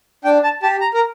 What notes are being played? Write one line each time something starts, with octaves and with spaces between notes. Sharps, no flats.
D4 G5
A5
G4 A5
A#5
A#4